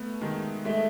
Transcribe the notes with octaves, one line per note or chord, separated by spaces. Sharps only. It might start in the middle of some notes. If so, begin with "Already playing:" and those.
Already playing: A3 B3
D#3 G#3
G#3 A3